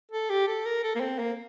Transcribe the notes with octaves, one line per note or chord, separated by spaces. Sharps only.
A4
G4
A4
A#4
A4
A#3
C4
A#3